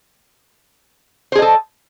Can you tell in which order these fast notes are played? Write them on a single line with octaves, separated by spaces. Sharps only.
C5 G#4 D#5 A4